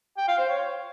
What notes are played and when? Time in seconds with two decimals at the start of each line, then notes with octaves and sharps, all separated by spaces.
0.17 G5
0.28 F5
0.38 C5
0.49 C#5